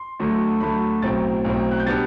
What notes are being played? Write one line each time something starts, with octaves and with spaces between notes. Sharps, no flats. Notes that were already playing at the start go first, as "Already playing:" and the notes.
Already playing: C6
D2 D3 F#3 A3
D2 D3 F#3 A3 B5
B1 A2 F#3 C4 A6
B1 A2 F#3 C4
F#6
G6
B2 G3 B3 D4 A6